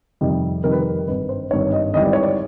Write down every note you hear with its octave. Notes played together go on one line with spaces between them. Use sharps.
F2 C3 D#3 G3
F2 C3 D#3 G3 A#4
B4
A#4
G#1 G2 D#3 B4
C5
G#1 G2 D#3 C#5
D#5
G#1 G#2 E3 G3 D#5
D5
C#5
D5